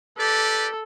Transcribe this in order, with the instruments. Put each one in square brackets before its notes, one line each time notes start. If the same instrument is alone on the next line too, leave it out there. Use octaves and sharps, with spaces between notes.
[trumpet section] G4 B4 D5 [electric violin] A4